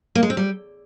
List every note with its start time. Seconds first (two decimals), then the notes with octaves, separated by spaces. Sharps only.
0.15 A#3
0.23 G#3
0.30 C4
0.37 G3